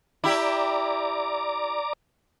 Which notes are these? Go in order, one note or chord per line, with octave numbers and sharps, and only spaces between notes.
E4 G4 D5 A#5 D6